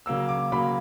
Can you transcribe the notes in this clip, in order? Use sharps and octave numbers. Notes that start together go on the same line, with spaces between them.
C#3 F#3 A#3 E6
D6
C#3 F#3 A#3 B5